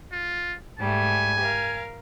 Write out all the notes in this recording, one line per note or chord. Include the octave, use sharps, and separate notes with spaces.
F4
G#2 G3 A3 G#5
A#4 F5